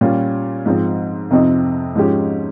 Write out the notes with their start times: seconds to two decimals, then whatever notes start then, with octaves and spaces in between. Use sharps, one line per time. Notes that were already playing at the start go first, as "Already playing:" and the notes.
0.01 A#2 G3 C#4 F4
0.66 G#2 F3 C4
1.31 F2 C3 F3 C4 D#4
1.95 G#2 F3 G#3 C#4 G4